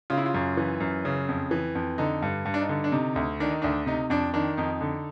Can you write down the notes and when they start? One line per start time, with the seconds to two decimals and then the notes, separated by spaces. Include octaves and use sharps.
0.10 C#3 F4
0.18 E4
0.26 F4
0.34 F#2
0.57 E3
0.80 F#2
1.05 C#3
1.28 F2
1.51 E3
1.75 F2
1.98 D3 D#4
2.22 G2
2.45 G2
2.54 D4
2.61 D#4
2.69 D3
2.84 D4
2.92 C3 D#4
3.16 D2
3.40 D#3 D4
3.50 D#4
3.62 D2 D4
3.86 C3 D#4
4.10 F2 D4
4.33 D#3 D4
4.57 F2 D#4
4.81 D3